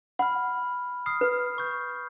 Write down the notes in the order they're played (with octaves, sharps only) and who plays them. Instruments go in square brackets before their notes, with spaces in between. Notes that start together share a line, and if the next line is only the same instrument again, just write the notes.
[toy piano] F#5 [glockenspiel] B5 F6
[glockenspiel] D#6 F6 C7
[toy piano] B4
[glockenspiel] C#6 G6